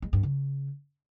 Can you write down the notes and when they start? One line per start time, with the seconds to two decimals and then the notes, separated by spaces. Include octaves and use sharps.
0.02 G#3
0.13 G2
0.23 C#3